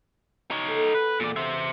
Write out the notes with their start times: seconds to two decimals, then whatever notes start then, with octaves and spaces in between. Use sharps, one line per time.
0.51 D#4 C#5
0.66 B3 A4
0.94 B4
1.20 E1 A#2 D5
1.36 C5 E5